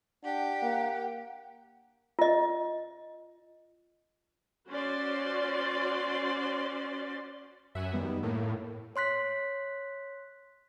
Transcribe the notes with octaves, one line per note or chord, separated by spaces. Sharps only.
D4 G4 F#5
A#3
F4 D#5
C#4 F#4 C5 D5 C6
F#2 E5 F#5 G#5
D#3 G3 B3
A2 A#3
C#5 C6 F#6 B6